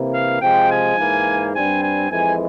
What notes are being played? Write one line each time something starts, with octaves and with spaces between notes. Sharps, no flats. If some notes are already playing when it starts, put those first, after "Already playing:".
Already playing: C3 E3 A#3
F5
C3 F3 G#3 G5
G#5
G#2 E3 A#3
G2 G3 C4 G#5
G#5
F2 E3 G#3 G#5